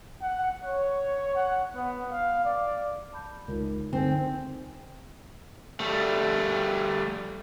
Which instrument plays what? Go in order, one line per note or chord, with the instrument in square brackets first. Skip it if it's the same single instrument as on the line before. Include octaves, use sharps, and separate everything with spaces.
[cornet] F#5
C#5
F#5
B3
F5
D5
[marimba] A5 B5 G6
[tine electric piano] C#2 [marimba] D#4 F4 A#4
[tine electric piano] D3 [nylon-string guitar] C4 [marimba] D#4 G#5
[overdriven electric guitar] G3 A3